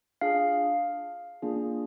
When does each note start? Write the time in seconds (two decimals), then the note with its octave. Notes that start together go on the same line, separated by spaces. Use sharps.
0.21 D4 F4 G#4 F5
1.42 A#3 D4 F4 G#4